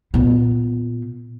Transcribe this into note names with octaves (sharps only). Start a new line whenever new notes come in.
A#2 B3